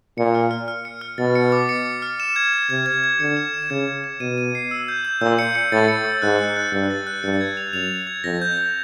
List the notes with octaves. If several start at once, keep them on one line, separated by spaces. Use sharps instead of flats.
A#2 C#7
F6
F6
F6
C#7
F6
B2 A6
C#7
D6
C#7
D6
F6
E7
G#6
G#6
C3 G#6
G#6
G#6
D3 C#7
E7
E7
C#3 G#6
G#6
E7
B2 D#7
D#7
C7
E6
G6
G6
A#2 E6
C#7
C#7
A2 A6
C#7
E6
G#2 F#6
F#6
F#6
G2 F#6
A6
F#6
G2 C#7
G#6
F7
F#2 F7
G#6
G#6
F2 A#6
G6
G6